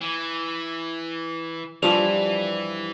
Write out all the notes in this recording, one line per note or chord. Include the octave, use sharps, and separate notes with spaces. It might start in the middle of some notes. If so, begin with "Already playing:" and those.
E3
G2 E3 F3 G3 D5 F7